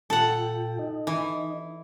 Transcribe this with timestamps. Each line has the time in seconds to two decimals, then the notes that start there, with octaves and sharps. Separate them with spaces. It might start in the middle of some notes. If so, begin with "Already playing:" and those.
0.10 A#2 F4 A4 F#5 G5
0.79 D#4 D#5
1.07 E3